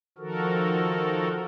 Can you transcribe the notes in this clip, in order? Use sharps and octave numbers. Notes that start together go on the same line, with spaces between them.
D#3 F3 F#4 A4 A#4